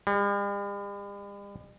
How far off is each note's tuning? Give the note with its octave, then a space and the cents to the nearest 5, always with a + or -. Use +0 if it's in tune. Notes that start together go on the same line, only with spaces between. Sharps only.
G3 +45